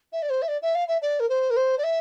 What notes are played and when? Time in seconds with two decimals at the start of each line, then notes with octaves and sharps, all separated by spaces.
0.12 E5
0.22 D5
0.29 C5
0.42 E5
0.48 D5
0.62 E5
0.75 F5
0.88 E5
1.02 D5
1.20 A#4
1.29 C5
1.50 A#4
1.56 C5
1.78 D5
1.83 E5